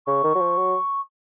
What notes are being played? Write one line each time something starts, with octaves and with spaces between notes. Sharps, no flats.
C#3 C#6
D#3
F#3
F3
F#3